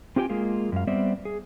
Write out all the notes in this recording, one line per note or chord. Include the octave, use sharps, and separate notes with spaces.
C4 F4 G4 A4 G5 G#5
G#3 A#3 F4 G#4
F#2 F5
G3 B3 C4 D5 E5
G#4